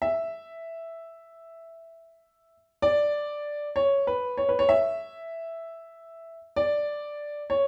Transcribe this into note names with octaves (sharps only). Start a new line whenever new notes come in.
E5
D5
C#5
B4
C#5
B4
C#5
E5
D5
C#5